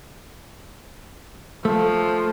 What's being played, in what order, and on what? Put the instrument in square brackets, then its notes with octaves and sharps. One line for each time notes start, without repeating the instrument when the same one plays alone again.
[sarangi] F3 [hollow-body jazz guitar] A3